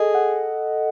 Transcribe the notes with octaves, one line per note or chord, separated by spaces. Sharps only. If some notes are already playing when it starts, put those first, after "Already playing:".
Already playing: G#4 A4 D#5
F#5